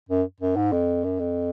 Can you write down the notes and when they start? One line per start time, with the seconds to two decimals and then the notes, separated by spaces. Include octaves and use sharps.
0.09 F#2
0.41 F#2
0.56 G#2
0.72 F2
1.04 F#2
1.20 F2